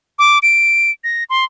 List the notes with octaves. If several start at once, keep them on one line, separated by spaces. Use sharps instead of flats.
D6
D7
A#6
C6